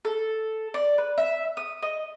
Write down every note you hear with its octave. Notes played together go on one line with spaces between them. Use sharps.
A4
D5
B4
E5
D#6
D#5